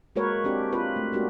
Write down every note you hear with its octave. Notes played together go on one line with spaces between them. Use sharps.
G#3 A#3 F#4 A#4 B4 C#5
C4 D4 F#4 G4
C4 F4 B4
A3
G#3 A#3 B3 D4 F#4 G4